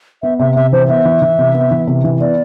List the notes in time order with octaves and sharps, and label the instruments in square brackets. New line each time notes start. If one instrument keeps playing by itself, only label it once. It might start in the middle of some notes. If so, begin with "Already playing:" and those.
[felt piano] B3 [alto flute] E5
[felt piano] C3 [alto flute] E5
[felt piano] C3 [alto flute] E5
[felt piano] E3 [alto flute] C5
[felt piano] B3 [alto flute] E5
[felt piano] E3
E3
C3
B3
E3
C3
E3
[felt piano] B3 [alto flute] D5